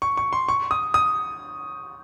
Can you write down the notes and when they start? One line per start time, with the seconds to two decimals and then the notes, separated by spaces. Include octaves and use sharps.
0.02 C#6
0.17 C#6
0.33 C6
0.48 C#6
0.71 D#6
0.94 D#6